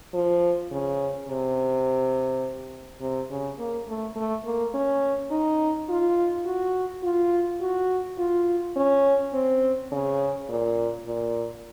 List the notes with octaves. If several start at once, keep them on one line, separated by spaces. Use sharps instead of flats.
F3
C#3
C3
C3
C#3
A#3
A3
A3
A#3
C#4
D#4
F4
F#4
F4
F#4
F4
C#4
C4
C#3
A#2
A#2